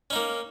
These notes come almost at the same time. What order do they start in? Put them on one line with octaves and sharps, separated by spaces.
C#4 D#4 A#3